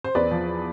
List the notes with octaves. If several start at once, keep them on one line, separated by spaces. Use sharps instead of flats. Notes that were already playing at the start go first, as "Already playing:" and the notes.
C5
E2 B4 D5
F3